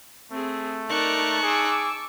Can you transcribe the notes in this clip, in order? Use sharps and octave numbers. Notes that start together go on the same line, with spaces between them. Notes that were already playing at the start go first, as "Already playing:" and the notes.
A3 C4 G#4
D#4 A#4 D5 A5 C#6 F#6
G#4 D6 E6